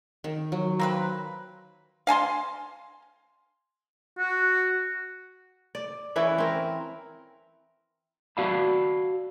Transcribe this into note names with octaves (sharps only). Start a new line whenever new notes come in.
D#3
F#3
A#3 C4 B4
F5 G#5 A5 C6
F#4
D5
E3 C#4 E4 B4
C4 A#4
F#4 D5 F5 A5 B5